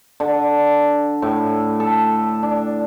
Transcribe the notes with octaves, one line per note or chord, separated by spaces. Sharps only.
D3
A2
A4
D4